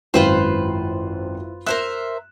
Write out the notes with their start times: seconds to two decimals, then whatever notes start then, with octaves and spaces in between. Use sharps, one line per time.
0.14 G#1 F#2 E4 F4 B4 C5 G5
1.67 A#4 C5 E5 F#6 E7